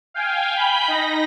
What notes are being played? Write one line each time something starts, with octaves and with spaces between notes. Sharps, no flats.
F5 G5 G#5
B5 G6 B6
D#4 A#6